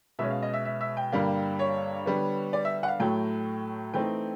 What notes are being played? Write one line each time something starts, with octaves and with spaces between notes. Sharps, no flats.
B2 G#3 C#4 E5
F5
D#5
E5
E5
E5
G5
G2 D3 G3 A#3
C#5
D3 G3 B3
D5
E5
F#5
F5
A2 F#3 A3 G5
E3 A3 C4 D#4 G5